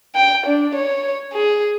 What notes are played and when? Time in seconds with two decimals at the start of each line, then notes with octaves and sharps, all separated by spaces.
0.15 G5
0.46 D4
0.75 C#5
1.33 G#4